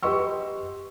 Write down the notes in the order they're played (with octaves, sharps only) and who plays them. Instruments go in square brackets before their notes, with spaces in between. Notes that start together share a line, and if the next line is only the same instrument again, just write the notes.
[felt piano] G4 B4 D#5 C6 C#6 E6